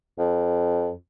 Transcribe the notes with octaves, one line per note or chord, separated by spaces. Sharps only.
F2